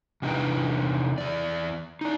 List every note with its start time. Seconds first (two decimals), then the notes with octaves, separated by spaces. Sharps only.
0.22 E2 C3 D4 D#4 B4 G5
1.18 E2 D5
2.01 D#4 D5